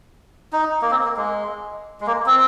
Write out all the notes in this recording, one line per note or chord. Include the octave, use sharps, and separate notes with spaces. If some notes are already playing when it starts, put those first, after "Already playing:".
D#4
A#3
C4
A#3
G#3
G#3
A#3
C4